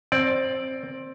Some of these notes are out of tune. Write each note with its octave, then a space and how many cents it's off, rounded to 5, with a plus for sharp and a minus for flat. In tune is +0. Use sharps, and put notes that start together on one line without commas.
C4 +15 D5 +0